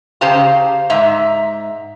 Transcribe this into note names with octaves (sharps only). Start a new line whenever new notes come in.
C#3 G4 C5 F5 A5 A#5
G#2 E5 A#5